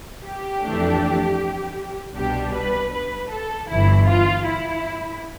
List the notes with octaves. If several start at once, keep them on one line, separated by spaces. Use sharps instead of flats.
G4
F2 E3 A3 D4
C2 B2 G3 D4 G4
B4
B4
A4
G1 G2 E3 E4
F4
E4